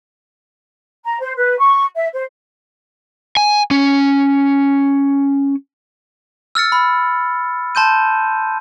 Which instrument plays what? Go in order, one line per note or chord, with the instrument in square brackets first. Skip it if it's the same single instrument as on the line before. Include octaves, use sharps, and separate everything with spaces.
[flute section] A#5
C5
B4
C#6
E5
C5
[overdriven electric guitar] G#5
C#4
[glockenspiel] E6 F6 A6 C#7
B5
A5 C6 G6 D#7